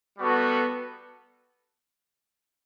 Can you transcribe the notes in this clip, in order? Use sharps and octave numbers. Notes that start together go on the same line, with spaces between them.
G3 B3 F#4 A4